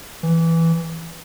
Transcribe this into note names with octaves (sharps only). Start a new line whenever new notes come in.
E3